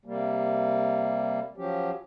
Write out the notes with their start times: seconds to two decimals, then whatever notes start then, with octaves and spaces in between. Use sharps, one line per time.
0.05 C3 G3 A#3
1.57 F3 F#3 C#4 G4